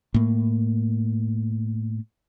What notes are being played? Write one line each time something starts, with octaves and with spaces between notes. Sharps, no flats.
A2 A#3